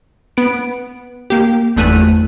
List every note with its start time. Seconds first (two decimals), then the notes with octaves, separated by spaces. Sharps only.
0.37 B3 D7
1.30 A#3 G4
1.77 G1 E2 A3 F#6 D#7